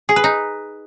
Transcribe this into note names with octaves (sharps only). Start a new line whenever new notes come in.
G#4
B4
D#4